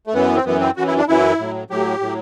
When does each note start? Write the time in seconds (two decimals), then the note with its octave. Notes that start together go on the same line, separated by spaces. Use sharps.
0.07 A3
0.14 F#2 E3 B3
0.35 C4
0.45 F#2 E3 B3
0.60 C4
0.76 F#2 E3 F#4
0.87 E4
0.98 D4
1.08 F#2 E3 E4
1.39 A2 F#3
1.70 A2 F#3 G4
2.01 A2 F#3